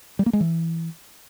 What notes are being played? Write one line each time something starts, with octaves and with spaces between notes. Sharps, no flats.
G3
A#3
G#3
E3